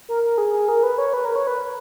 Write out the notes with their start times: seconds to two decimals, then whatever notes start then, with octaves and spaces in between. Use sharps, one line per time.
0.09 A#4
0.23 A#4
0.38 G#4
0.53 G#4
0.68 A#4
0.83 B4
0.98 C#5
1.13 B4
1.25 A#4
1.36 C#5
1.47 B4